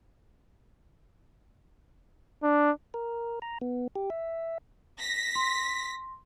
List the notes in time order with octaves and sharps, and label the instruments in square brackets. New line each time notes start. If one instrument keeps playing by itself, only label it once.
[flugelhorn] D4
[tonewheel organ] A#4
A#5
B3
G4
E5
[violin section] A#6 B6
[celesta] C6